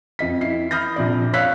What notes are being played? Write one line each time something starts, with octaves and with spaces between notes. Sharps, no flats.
F2 D#5 B6
E4 C7
B5 D#6 F6 G6 A#6
A#1 C3 D5
C#5 F5 E6 F#6 B6